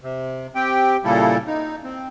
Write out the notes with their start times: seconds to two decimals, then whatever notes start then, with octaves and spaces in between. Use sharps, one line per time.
0.01 C3
0.55 C4 G4 G5
1.04 A#2 C#3 G3 A#3 E4 A4
1.47 D#4
1.84 C4